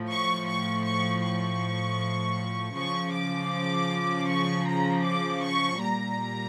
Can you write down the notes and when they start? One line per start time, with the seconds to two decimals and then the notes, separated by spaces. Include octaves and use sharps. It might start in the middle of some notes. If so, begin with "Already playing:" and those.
Already playing: A2 F3
0.09 C#6
0.47 C#6
0.85 C#6
1.23 C#6
2.75 C#3 F3 C#6
3.13 D6
4.28 C#6
4.66 A#5
5.04 D6
5.42 C#6
5.80 A#2 G3 A#5